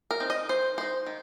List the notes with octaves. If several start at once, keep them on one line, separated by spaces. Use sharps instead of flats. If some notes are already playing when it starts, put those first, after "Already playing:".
A#4
C4 D#4
D#5
D#3 C5
G#3 D#4 C5
D#3